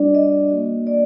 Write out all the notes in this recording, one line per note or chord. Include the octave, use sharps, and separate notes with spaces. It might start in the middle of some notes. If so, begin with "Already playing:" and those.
Already playing: G3 D4 F#4 D5
D#5
A#3 F#4
D5